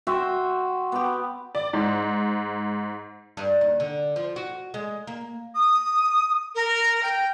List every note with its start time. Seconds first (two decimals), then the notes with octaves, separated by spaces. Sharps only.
0.07 F#4 C5 E5 G5
0.92 B3 G4
1.55 D5
1.73 G#2
3.37 G2
3.61 D#2
3.80 D3
4.16 F3
4.36 F#4
4.74 G#3
5.07 A#3
5.55 D#6
6.55 A#4
7.03 G5